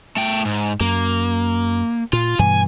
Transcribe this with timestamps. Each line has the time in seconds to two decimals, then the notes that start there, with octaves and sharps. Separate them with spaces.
0.17 A3 G5
0.45 G#2
0.80 F#2 A#3
2.13 A#2 F4
2.39 G2 B2 E3 G#5